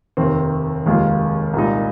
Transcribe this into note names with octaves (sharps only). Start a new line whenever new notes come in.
F1 D#2 D#3 C4
F1 D#2 D#3 G#3 F4
C2 A#2 G#3 D#4